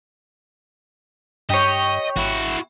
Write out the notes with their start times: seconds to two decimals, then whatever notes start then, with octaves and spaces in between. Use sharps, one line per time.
1.50 G2 G4 C#5 D#5
2.16 G#1 E4 F#4